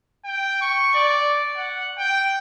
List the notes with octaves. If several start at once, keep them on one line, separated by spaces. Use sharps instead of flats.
G5
C#6
D5
F#5
G5